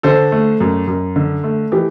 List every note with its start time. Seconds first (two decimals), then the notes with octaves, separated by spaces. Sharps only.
0.03 D3 A4 C5
0.32 A3
0.60 F#2
0.87 F#2
1.16 D3
1.44 A3
1.72 E3 G4